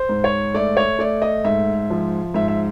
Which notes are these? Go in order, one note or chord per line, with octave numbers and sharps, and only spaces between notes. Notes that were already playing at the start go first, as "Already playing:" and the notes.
Already playing: C5
G#2
C#5
A3 D5
C#5
A3 D5
D#5
G#2 E5
F3
G#2 E5
E5